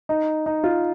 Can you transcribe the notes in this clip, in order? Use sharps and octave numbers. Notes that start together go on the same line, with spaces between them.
D#4
D#4
F4